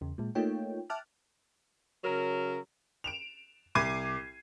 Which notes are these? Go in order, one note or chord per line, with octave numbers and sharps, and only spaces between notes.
E2 C#3
A#2 G#3
A3 A#3 D#4 F4 C#5 G5
E5 G5 A5 D6 F6 F#6
C#3 F#3 A#4
D7 E7 F7
C2 D6 G#6 C7 D#7